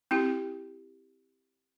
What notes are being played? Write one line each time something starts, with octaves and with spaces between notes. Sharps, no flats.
C4 E4 G4